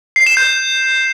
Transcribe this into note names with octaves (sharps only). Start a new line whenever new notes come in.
C7
E7
G6